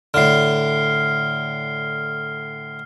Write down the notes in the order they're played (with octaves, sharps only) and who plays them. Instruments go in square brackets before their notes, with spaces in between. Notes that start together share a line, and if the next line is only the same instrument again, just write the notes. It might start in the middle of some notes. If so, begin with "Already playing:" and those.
[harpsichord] A2 D3 [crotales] F6 C7